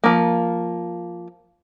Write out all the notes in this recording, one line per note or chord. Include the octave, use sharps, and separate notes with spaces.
F3 A#3